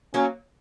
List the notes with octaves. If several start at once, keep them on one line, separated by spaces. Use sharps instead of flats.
F#3 A#3 C#4